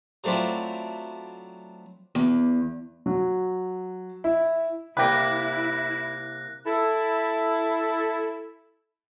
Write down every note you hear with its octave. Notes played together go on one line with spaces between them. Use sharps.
F#3 A3 C4 D4 E4 F4
E2
F#3
E4
C2 A#3 E4 D5 G5 B5 F#6 A#6
E4 A4